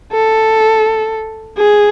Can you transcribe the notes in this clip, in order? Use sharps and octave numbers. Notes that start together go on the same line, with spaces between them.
A4
G#4